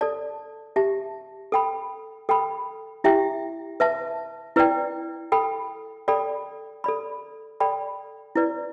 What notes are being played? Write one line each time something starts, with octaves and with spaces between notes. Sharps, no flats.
A4 D5 A5
G4 E5 A5
A4 G5 B5
A4 G5 B5
E4 G4 E5 G5
B4 E5 A5
E4 B4 D5 G5
A4 G5 B5
A4 D5 G5 B5
A4 D5 B5
A4 D5 G5 B5
E4 B4 D5